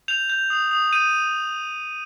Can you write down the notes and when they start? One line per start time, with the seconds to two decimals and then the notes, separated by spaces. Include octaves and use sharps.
0.08 G6 F7
0.30 G6
0.50 D#6
0.71 D#6
0.92 G6 D#7